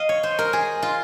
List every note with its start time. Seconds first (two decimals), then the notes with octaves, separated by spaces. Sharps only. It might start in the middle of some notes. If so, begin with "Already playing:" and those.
Already playing: D#5 F5
0.09 C#5
0.23 C5
0.39 A#4
0.53 G#4
0.82 F4